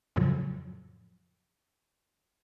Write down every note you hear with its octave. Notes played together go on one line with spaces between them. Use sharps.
F2 A2 C#3 F3 F#3